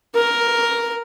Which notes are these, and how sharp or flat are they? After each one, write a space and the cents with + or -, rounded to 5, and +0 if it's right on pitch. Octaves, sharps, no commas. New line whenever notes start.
A#4 +5